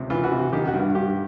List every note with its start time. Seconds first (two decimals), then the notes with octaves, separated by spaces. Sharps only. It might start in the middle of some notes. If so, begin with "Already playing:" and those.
Already playing: C#2 C3
0.10 E3 F4
0.24 F#4
0.32 C3
0.39 F#4
0.53 D#3 G4
0.67 F#4
0.73 G2
0.81 F#4
0.95 G2 G4